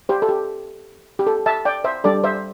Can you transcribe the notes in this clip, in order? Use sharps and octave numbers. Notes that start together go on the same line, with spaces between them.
G4 C5
A4
G4
G4
A4
E5 A5
D5 G5
C5 E5
G3 D4 G4 A4 D5
C5 E5